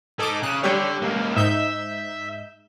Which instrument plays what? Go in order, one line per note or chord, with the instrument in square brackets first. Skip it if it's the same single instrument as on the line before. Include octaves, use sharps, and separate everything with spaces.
[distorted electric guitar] D#4 G#4 [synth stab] A4 D6
[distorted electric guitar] C#3 [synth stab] F#6
[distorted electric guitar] D3 [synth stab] G3 G4 C#5
[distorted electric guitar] C#2 A#3
[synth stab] G#2 D#4 G6 [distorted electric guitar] E5